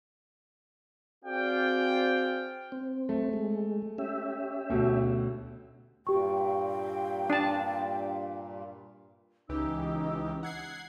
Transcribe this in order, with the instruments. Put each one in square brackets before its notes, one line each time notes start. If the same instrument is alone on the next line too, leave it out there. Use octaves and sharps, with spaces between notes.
[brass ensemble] C4 F#4 G#4 D5 F5 G5
[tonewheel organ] C4
[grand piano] A3
[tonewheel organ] G#3
C#4 G4 E5
[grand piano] D2 B2
[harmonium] G2 A#2 [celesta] G4 C#6 [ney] G5
[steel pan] D4 A5
[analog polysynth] C#2 E3 G4 [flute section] C#4 D#4 E6
[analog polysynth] F#5 G#6 C7